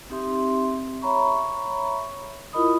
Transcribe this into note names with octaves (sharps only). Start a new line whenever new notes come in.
C4 D#4 G4 E5 C6
C#5 E5 A#5 B5 C#6
E4 F4 A#4 D#5 B5 D#6